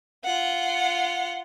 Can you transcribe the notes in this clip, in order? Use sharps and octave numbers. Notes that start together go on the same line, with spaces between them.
F4 F#5